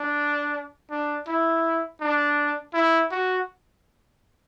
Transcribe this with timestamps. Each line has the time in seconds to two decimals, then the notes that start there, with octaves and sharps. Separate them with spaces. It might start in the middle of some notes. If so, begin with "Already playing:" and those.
Already playing: D4
0.90 D4
1.27 E4
2.01 D4
2.74 E4
3.11 F#4